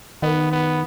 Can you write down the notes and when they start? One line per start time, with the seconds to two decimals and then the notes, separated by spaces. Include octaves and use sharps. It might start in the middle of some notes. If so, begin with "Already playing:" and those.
0.22 D#3 B3
0.52 B3